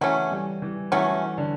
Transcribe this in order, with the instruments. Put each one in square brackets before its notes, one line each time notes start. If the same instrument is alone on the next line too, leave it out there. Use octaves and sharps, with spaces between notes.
[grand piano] E3 [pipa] F#3 A3 C#4
[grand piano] G3
E3
[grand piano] E3 [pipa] F#3 A3 C#4
[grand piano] D3